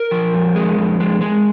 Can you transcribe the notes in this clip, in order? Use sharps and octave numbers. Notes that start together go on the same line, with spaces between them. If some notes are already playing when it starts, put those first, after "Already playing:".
Already playing: A#4
F3
F2
G#3
F2
G#3
G#3